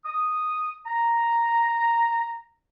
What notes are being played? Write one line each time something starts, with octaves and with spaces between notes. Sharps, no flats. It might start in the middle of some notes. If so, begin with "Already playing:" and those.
D#6
A#5